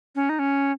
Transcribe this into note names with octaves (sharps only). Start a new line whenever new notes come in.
C#4
D#4
C#4